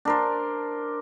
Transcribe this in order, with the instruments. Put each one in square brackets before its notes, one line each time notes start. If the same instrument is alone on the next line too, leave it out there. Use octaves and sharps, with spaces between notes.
[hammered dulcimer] D4 A#4 C5